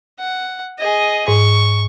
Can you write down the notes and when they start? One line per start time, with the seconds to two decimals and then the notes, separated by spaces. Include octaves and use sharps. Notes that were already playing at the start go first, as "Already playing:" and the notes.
0.20 F#5
0.79 G#4 D#5
1.28 G#2 C#6